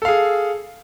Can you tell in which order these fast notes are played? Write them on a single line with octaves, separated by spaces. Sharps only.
A4 F5 G#4